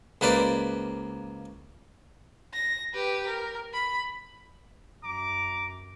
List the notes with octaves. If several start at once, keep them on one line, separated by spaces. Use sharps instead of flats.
C#2 A#3 B4 C5 D5 B5
A#6
G4 B4
A#4
B5
F#2 A#5 D6